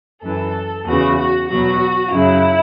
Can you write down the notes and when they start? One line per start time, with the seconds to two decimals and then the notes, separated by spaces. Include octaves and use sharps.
0.22 F#2 E3 A4
0.86 E2 C#3 E3 F#4
1.17 F#4
1.48 E2 B2 F#3 F#4
2.12 F#2 C#3 F#3 E4